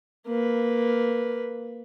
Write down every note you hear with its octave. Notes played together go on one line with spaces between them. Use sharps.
A#3 B4